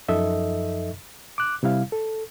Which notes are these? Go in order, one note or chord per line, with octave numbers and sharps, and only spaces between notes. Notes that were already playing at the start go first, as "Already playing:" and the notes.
F#2 F3 D#4 A4 D#5 E5
D6 F#6
C3 G3 E4 F5
A4